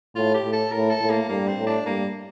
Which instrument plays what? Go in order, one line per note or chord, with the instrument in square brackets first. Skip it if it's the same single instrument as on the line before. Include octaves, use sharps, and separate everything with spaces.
[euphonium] A2 [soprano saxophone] F4
[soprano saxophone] G4
[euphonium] A2
[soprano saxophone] A4
[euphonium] A2 [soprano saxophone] A#4
[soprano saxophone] A4
[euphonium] A2
[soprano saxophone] A#3
[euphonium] G2 [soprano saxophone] A#3
[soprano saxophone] C4
[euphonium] A2
[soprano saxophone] D4
[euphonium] G2 [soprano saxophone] A#3